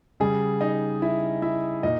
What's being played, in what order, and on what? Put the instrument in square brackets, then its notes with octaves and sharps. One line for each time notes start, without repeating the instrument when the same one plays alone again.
[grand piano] C#3 G3 G#4
D#4 D#5
E4 E5
E4 E5
A#2 D#4 D#5